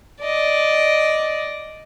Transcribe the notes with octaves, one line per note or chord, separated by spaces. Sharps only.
D5 D#5